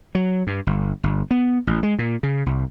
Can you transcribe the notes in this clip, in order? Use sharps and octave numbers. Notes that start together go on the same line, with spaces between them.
F#3
G2
G1
G1
B3
A1
G#3
A#2
C#3
C2